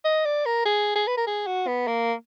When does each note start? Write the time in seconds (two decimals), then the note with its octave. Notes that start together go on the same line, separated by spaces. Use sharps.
0.05 D#5
0.25 D5
0.46 A#4
0.65 G#4
0.96 G#4
1.07 B4
1.17 A#4
1.27 G#4
1.47 F#4
1.67 B3
1.87 A#3